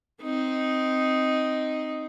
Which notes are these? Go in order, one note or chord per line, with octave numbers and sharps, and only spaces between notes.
C4 D#4